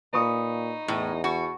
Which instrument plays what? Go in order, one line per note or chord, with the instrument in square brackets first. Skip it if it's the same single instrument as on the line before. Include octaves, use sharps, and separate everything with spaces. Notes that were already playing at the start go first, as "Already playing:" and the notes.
[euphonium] A#2 [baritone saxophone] D#4 [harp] B4 C#6 D#6
[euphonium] E2 [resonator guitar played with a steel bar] A2
[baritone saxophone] B2 [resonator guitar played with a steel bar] F#4